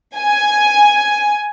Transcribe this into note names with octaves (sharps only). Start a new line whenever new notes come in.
G#5